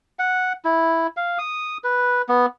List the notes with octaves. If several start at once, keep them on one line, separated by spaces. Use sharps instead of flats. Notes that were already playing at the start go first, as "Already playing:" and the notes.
F#5
E4
F5
D#6
B4
B3